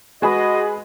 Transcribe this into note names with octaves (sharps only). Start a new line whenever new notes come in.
G#3 F#4 G#4 B4 D#5